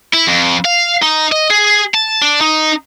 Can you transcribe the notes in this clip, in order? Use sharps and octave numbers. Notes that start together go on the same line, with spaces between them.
E4
F2
F5
D#4
D#5
G#4
A5
D4
D#4